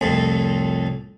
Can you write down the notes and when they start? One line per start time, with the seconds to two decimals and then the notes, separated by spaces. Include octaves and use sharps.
0.01 C2 F2 A2